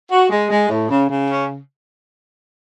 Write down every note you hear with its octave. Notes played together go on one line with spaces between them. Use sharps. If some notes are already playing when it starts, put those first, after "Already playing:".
F#4
G#3
G#3
A2
C#3
C#3
C#4